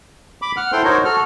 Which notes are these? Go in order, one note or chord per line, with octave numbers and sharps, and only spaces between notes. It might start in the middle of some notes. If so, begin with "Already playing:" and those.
B5 D6
F#5 F6
E4 A4 C5 G5 C6
D#4 F#4 A#4 C5 C#5
F#4 A4 F6